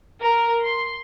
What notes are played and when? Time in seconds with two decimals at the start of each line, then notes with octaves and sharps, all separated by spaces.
0.21 A#4
0.64 C6